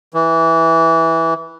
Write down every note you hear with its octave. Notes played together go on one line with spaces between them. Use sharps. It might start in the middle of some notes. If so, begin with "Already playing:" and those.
E3